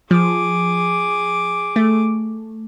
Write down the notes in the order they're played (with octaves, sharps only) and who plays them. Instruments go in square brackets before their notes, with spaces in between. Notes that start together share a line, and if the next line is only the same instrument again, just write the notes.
[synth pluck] F3 [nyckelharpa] G#4 D6
[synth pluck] A3